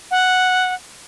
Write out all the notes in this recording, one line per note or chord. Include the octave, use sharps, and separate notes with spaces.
F#5